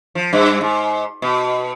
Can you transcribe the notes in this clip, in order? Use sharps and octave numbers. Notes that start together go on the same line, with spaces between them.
F3
G2
G#2
B2